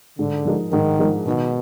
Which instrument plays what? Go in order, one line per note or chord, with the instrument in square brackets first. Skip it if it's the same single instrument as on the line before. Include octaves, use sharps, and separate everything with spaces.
[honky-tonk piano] G#2 [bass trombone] D3
[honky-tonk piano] F3 G#3 D#4 A#4
[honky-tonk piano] G#2 [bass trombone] D#3
[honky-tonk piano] F3 G#3 D#4 A#4
[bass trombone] B2 [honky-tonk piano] D#3